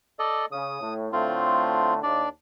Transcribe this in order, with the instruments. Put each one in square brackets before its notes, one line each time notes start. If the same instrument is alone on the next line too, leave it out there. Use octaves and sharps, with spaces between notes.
[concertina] A4 D5 D#5
[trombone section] C#3 [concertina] D#6
[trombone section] A2
[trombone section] A2 D3 A3 [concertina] C4 F4
[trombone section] D#2 [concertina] D4 D5